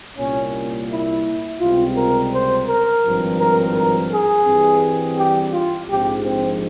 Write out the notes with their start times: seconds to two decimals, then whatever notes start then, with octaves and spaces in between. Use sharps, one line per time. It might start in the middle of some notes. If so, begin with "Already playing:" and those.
0.18 C2 A#2 G3 A#3 C#4
0.89 E4
1.60 C#2 C3 G3 C4 F4
1.96 A#4
2.33 C5
2.67 A#4
3.03 G#1 G2 F3 C4
3.39 A#4
3.74 A#4
4.11 G#4
4.46 G2 E3 G3 C4
5.17 G4
5.52 F4
5.88 A#1 G#2 F3 G#3 C4 G4
6.24 C4